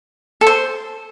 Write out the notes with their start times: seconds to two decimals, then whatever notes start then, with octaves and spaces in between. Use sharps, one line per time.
0.41 A4
0.47 C5